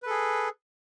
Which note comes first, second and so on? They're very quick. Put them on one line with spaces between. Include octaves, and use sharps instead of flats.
B4 A4 G#4